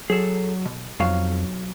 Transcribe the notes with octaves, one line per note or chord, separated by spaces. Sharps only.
F#3 G#4 A4
B2
B1 F2 F#3 F5